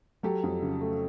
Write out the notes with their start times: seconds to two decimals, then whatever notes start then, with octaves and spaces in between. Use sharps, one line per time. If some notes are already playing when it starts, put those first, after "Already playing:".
0.23 F#3 G4 A4
0.43 F2
0.62 C#3
0.81 A3